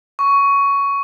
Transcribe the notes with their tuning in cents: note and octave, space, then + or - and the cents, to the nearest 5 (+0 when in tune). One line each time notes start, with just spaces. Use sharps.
C#6 +10